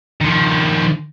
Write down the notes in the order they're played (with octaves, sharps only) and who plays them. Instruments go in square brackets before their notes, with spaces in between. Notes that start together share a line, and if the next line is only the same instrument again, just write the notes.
[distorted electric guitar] D#3 F3